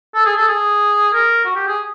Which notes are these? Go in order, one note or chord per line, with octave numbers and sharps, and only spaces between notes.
A4
G#4
A4
G#4
A#4
F#4
G4
G#4